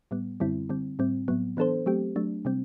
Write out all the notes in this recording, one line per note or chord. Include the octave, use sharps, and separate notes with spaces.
A2 G3 B3
F#2 D3 G3 C4 E4
D3 G3 C4
A2 G3 C4
A2 F#3 B3
E3 B3 D4 A4 C5
F#3 A3 C4 G4
F#3 A3 D4
C3 G3 C4